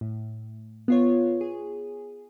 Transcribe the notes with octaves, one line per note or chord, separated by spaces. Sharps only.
A2
B3 F4 C#5
G#4